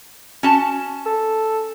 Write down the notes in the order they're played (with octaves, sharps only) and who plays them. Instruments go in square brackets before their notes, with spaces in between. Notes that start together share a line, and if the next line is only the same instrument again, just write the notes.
[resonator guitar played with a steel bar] C#4 F#4 A5
[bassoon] A4